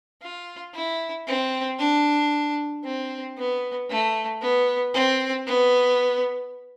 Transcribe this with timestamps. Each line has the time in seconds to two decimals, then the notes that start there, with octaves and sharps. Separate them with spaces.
0.22 F4
0.74 E4
1.27 C4
1.79 D4
2.84 C4
3.37 B3
3.90 A3
4.42 B3
4.94 C4
5.47 B3